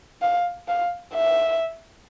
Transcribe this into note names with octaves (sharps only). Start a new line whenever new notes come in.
F5
F5
E5